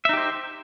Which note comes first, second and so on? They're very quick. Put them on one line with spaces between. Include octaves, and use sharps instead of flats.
E5 D#4 G4 C5